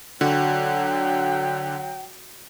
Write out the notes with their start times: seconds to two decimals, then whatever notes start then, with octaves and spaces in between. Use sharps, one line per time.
0.21 D3 F#3 F#4 G5